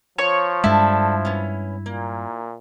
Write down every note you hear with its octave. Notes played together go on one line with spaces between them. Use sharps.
F3 C#5
G2 G#3 E4 A4 D5
B3 C#4
A#2 A#3